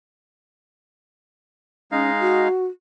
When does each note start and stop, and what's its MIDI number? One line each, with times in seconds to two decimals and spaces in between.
1.92 2.48 56
1.92 2.11 61
1.92 2.48 63
1.92 2.48 77
2.20 2.66 66